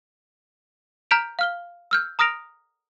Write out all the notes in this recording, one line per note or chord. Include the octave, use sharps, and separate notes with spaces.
A#5 F6 G6 B6 D7 F7
F5 F6 G7
E6 F6 G6
A#5 D#6 F6 A#6 D7 F7